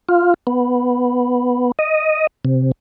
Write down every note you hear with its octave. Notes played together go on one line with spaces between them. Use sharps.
F4
B3
D#5
C3